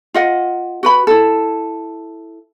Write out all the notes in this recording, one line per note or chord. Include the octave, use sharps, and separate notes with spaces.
F4 D#5 F#5
F#4 B4 B5
E4 A4